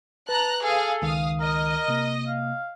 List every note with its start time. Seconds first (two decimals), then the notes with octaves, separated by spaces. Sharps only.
0.29 B4 A5 A#5 F#6
0.64 G#4 A4 F5
1.02 C#2 D#3 F5 D#6
1.40 A#4 D#5
1.88 C3 A#3
2.27 F5